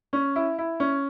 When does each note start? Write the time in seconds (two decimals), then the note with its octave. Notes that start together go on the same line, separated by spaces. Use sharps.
0.13 C#4
0.36 E4
0.58 E4
0.80 C#4